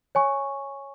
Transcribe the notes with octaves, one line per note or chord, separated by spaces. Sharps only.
C#5 G#5 C#6